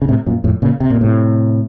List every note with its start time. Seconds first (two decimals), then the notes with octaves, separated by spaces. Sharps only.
0.02 C#3
0.08 A2 C3
0.26 F#2 A#2
0.44 F2 A2
0.62 A#2 C#3
0.80 C3
0.90 A#2
1.01 A2 C3